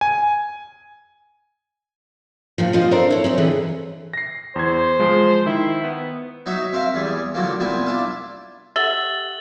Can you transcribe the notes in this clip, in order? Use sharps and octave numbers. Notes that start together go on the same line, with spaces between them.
G#5
G2 A#2 F3
F3 G3 F4 C5 D#5
C4 D4 F4 A4 A#4 C5
E4 C#5
C4 C#4 D#4
E2 D3 E3 G3 G#4 B4
A#6 C7
E2 C5 G#6
F3 G#3
D#3 E4
B3
F#3 D#4 F#4 C#5 E5
C4 A#4 E5 F5
E2 G3 G#4
A2 D3 F3 F#3 A#3
C2 A#2 B3 C4 G#5
D4 E4 F4
G4 A4 E5 F#5 A6 F#7 G7